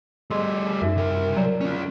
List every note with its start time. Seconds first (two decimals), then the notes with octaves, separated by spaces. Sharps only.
0.31 G3 G#4 D#5 C6 E6
0.82 F#2 D#4 F#4 E5
0.97 C2 A#4
1.37 F#3 D5 E7
1.61 C#4 F4